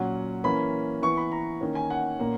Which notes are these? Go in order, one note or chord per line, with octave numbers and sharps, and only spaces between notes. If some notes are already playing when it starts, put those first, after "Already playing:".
Already playing: A#2 F#3 C#4 F#5
E3 A#3 C#4 B5
E3 B3 C#6
B5
A#5
D#3 A#3 C#4
G#5
F#5
A#2 A#3 C#4